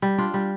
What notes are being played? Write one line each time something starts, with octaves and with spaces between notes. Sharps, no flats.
G3
D4 F4
G3